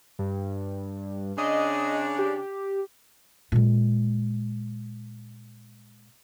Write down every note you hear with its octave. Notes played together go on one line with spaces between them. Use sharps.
G2
C#3 D4 D#5
G4
A#2 G#3